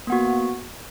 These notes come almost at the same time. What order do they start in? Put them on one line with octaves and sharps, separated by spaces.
A#3 B3 F#4